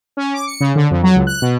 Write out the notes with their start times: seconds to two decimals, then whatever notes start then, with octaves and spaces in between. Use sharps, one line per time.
0.17 C#4
0.34 D6
0.47 C#7
0.60 C#3
0.75 D3
0.91 F2
1.03 F#3
1.16 C#2
1.27 F#6
1.42 B2